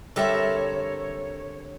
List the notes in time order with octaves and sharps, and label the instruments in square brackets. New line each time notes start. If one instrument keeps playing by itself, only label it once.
[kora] D3 G3 C4 [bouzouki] A4 A#4 E5 [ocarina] C#5